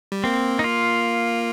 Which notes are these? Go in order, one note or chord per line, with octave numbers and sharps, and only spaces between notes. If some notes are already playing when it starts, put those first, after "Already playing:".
G3
A#3 C4
D#4
F4